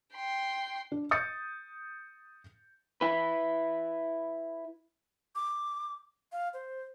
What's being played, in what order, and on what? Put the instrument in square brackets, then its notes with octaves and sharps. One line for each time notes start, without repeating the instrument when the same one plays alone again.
[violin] G5 C6
[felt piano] D4
D#6 G6 A6 C#7
[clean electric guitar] E4 B4
[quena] D6
F5
C5